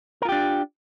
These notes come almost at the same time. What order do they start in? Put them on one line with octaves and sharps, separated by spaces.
A#4 F4 G4 D4